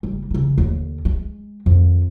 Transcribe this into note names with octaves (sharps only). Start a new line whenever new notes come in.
F#1 G3
C#3 E3
D#2 D3
G#3 A3
F2 D#3